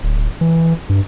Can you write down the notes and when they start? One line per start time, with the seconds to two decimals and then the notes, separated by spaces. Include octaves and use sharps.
0.03 D1
0.41 E3
0.89 G2